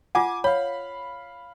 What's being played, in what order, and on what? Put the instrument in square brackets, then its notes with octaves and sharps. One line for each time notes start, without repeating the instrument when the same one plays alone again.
[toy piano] F4 F#5 [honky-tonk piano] G#5 D6
[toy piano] C#5 [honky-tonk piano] F5 B5